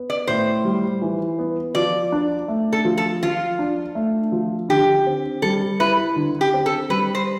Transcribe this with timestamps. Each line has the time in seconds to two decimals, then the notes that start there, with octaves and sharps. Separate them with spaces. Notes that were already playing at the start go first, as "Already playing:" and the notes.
Already playing: B3
0.10 D5
0.27 A2 C5
0.64 G3
1.02 E3
1.39 B3
1.75 F3 D5
2.12 D4
2.48 A3
2.72 A4
2.85 F3
2.97 A4
3.23 F3 F4
3.59 D4
3.95 A3
4.32 F3
4.69 D3 G4
5.07 C4
5.42 G3 A4
5.80 E4 B4
6.16 D3
6.41 G4
6.54 C4
6.66 A4
6.90 G3 B4
7.15 C5